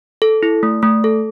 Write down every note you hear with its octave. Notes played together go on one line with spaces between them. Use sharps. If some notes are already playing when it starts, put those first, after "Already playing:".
A4
E4
A3
A3
A4